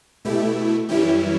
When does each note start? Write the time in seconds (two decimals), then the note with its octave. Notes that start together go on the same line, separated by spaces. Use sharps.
0.25 B2 A3 E4 G4
0.88 F#2 E3 G3 C#4 E4 G4